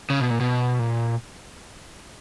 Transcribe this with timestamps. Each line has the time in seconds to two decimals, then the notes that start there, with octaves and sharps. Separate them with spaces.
0.10 C#3
0.20 B2
0.30 A#2
0.40 B2
0.79 A#2